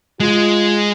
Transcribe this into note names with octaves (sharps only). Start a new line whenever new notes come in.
G#3 F4